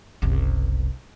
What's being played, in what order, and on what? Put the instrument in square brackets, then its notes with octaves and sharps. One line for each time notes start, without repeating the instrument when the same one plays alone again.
[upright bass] F#1 C2